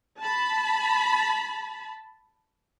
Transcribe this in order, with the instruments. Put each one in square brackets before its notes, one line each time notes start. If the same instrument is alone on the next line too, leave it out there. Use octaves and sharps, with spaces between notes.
[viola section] A5 B5